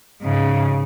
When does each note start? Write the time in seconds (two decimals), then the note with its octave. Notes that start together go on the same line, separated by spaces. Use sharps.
0.22 G#2 C#3